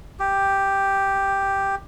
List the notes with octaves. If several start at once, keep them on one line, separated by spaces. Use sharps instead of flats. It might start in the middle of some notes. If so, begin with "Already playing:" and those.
G4